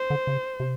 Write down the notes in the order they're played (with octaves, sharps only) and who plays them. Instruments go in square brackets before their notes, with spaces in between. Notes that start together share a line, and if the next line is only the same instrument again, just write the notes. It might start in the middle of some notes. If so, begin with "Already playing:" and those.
Already playing: [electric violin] C5
[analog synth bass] D3
C#3
C3